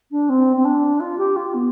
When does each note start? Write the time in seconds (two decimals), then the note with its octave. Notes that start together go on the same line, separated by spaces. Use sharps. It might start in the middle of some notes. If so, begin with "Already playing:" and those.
0.11 D4
0.29 C4
0.56 C4
0.64 D4
1.00 F4
1.18 G4
1.36 F4
1.54 B3